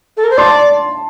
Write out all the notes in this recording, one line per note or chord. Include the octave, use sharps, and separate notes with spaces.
A4
A#4
C5
D5 A5 C6